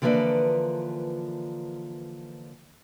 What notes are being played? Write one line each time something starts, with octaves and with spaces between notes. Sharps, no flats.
D3 E3 F3 A#3 B4 D5